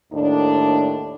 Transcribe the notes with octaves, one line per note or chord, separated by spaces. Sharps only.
D#2 A2 D4